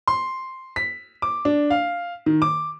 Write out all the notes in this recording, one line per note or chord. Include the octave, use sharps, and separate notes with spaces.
C6
B6
D6
D4
F5
D#3
D6